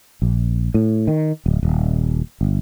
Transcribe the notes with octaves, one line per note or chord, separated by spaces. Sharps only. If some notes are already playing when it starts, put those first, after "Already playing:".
A#1
A2
D#3
D1
D#1
G1